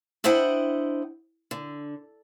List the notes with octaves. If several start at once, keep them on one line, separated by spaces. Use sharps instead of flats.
D4 E4 C5 D#5 F#5 G5
D3